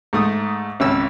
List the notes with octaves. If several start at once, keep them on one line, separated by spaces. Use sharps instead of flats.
G#2 A3 D#6
G#1 C#2 C#4 E6